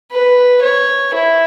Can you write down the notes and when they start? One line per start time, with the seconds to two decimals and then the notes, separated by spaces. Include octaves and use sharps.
0.11 B4
0.62 C#5
1.14 E4